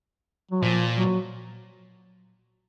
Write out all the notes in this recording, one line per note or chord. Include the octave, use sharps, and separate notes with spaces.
F#3
A#2 F3
F#3